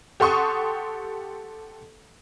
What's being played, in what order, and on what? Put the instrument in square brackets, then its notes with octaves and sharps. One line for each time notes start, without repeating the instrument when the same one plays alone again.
[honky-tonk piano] G4 A4 F#5 C6 C#6 D#6